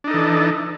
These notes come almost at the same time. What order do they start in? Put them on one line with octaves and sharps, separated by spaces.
D4 D#4 A4 E3